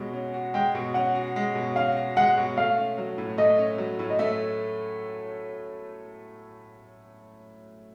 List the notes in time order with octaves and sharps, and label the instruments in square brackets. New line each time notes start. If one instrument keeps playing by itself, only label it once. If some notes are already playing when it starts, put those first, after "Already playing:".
Already playing: [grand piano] B2 G#3 C#4 F#4
C#4
F#4
[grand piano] G#3 [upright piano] G5
[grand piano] B2
[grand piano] C#4 [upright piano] F#5
[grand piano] F#4
G#3
B2
[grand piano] C#4 [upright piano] F5
[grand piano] F#4
[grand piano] G#3 [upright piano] F#5
[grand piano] B2
[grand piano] A3 [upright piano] F5
[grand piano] C#4
F#3
A2
[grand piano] A3 [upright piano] D#5
[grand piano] C#4
F#3
A2
[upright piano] D#5
[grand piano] A3 [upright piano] E5